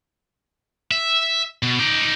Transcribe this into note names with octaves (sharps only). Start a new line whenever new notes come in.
E5
B2
D#4 D5